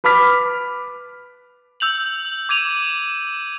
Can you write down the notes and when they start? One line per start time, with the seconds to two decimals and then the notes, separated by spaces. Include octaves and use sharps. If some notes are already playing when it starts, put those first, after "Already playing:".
0.04 B4 B5 D6 F6 B6
1.80 E6 G6 F7 F#7
2.49 D6 G#6 D#7 F7